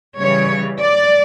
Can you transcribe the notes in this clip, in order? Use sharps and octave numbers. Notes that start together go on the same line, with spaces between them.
C#3 E3 G3 C#5
D5